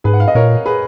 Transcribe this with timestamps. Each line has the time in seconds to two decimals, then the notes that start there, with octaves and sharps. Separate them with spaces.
0.04 G#2 G#4 B4
0.13 F#5
0.20 F5
0.28 D#5
0.35 A#2 A#4 C#5
0.65 G#4 B4